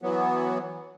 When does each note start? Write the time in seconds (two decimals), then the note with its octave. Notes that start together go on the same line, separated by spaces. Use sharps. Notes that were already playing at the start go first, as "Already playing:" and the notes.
0.02 E3 F#3 B3